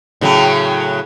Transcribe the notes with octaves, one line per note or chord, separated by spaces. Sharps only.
A2 C#3 F#3